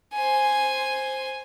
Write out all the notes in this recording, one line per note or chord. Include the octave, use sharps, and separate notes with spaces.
C5 G#5